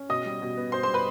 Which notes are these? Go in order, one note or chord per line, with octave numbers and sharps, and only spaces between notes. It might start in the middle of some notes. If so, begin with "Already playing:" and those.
Already playing: C#4
B2 D#5 D#6
G3
B2
B3
B2 C5 C6
C5 C6
G3
B4 B5